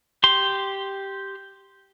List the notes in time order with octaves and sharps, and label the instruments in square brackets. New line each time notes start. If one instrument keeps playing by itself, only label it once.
[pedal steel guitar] G4 C6